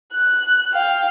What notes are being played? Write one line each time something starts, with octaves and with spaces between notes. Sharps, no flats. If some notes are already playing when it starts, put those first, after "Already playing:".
F#6
F5 G5